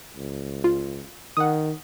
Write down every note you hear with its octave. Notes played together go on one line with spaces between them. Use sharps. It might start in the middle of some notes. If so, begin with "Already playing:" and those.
C#2
F4
D#3 F#5 D#6